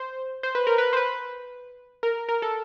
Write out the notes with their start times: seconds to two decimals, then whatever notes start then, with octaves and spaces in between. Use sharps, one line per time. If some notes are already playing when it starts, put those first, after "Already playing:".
Already playing: C5
0.43 C5
0.55 B4
0.67 A#4
0.78 B4
0.93 C5
0.97 B4
2.03 A#4
2.29 A#4
2.42 A4